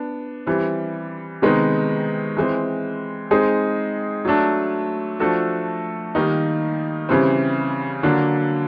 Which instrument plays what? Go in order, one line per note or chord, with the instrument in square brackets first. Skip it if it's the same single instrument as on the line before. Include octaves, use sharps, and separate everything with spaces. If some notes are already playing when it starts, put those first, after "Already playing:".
Already playing: [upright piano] B3 D4
E3 G3 C4
C3 D#3 G#3 B3 D#4
E3 G#3 C4
G#3 C4 D#4 G#4
F#3 A3 D4
F3 A3 D4 F#4 A4
D#3 G3 A#3 D#4
C#3 E3 G3 C4
D3 F#3 A#3 D4